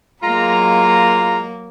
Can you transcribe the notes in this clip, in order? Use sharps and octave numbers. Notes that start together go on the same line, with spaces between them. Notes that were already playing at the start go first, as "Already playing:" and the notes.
F#3 G#3 A#3 F4 A#5